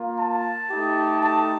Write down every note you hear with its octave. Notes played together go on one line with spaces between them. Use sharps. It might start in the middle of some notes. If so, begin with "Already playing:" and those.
Already playing: A#3 F4
A5
A3 D#4 G4
A5